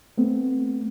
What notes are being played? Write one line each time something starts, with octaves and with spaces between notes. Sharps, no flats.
A3 B3 C4